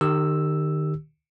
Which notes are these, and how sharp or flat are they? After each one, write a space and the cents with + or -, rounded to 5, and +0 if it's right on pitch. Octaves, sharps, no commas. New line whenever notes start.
D#3 -35 G4 +0 E6 +0